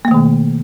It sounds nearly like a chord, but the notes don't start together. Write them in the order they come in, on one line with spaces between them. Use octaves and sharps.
A#3 A3 D#3 B2